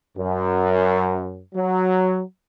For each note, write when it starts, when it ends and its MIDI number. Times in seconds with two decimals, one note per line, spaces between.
0.17 1.41 42
1.54 2.21 54